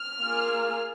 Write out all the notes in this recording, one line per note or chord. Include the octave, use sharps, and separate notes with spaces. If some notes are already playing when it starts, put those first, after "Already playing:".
Already playing: F6
A#3 F4 G#4